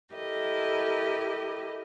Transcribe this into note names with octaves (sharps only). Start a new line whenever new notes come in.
E4 G4 A4 A#4 D#5